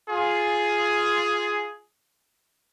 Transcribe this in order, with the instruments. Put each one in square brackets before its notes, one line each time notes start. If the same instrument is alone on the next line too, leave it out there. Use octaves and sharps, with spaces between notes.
[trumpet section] F4 G#4